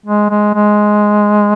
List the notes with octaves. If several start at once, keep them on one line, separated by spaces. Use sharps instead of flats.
G#3
G#3
G#3